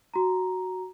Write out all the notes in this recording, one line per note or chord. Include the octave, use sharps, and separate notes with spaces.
F#4 A#5